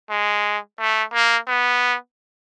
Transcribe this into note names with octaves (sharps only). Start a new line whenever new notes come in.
G#3
A3
A#3
B3